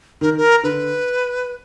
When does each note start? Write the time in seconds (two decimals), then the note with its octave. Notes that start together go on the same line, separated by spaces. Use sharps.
0.21 D#3 A#4
0.37 A#4
0.63 D3 B4